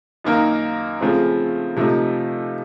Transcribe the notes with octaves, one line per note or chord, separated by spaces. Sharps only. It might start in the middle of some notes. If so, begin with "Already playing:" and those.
F#2 D#3 A#3 D#4 A#4
C#3 F3 A3 C4
C3 F3 A3 D#4